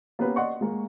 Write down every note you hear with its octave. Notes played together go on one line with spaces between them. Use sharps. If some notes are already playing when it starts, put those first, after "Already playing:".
A#3 B3 C#4 G4 B4
D5 D#5 F#5 C6 C#6
G#3 A#3